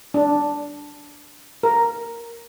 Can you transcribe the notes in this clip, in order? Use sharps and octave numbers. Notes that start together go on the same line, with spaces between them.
D4
A#4